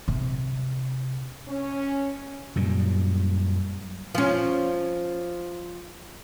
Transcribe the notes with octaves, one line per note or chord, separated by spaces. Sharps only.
C3
C#4
F#2 A#2 G3
F3 C#4